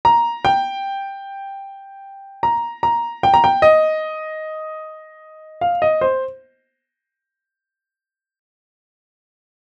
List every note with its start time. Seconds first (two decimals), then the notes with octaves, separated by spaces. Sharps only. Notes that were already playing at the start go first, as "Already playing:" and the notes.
0.05 A#5
0.45 G5
2.43 A#5
2.83 A#5
3.23 G5
3.34 A#5
3.44 G5
3.62 D#5
5.61 F5
5.82 D#5
6.01 C5